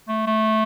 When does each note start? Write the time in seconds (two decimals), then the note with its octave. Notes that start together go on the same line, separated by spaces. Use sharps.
0.08 A3
0.27 A3